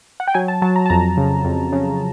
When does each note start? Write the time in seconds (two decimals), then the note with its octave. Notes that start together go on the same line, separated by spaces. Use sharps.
0.20 F#5
0.27 G5
0.34 F#3 G#5
0.48 A5
0.62 F#3 A5
0.76 A#5
0.86 A5
0.90 F2 A#5
1.17 C#3
1.45 F2
1.72 C#3